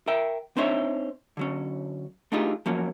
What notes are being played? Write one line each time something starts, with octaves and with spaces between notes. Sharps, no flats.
A#4 E5 G5
C4 D4 D#4 C5 C#5 E5
D3 F#3 C#4
A3 D4 D#4 F4 G4 G#4
F3 F#3 A#3 C#4